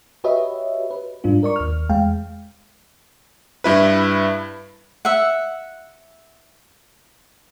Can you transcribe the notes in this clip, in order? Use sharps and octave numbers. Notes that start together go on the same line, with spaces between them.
F#4 G4 B4 C#5 D#5 E5
B4
G#2 G3 D4 F4
A#4 D5 C#6
D#2 F6
E2 G#3 F5 G5
G2 E4 B4
E5 F#5